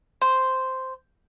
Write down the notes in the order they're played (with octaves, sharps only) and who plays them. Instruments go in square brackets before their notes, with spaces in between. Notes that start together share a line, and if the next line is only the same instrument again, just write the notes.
[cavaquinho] C5